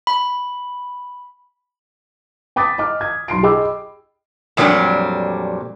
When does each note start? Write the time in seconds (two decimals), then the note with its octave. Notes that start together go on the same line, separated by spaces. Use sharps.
0.07 B5
2.56 G5 B5 D6 D#6 A6 B6
2.78 D#5 D6 F6
3.01 G#6
3.28 B1 C6 C7 D7
3.43 G#4 D#5 G5 B5 D6 E6
4.57 F2 A#2 F#3 G3 D4